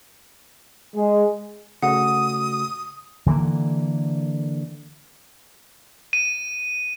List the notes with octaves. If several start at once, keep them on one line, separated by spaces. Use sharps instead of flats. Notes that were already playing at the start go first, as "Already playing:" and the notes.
G#3
C#3 A3 F#4 F#5 D#6
D3 E3 A3 A#3
D#7